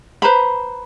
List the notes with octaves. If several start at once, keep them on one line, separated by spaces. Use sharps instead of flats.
B4 C5 A#5 B5